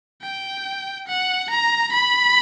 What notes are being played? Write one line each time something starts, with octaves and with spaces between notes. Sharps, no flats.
G5
F#5
A#5
B5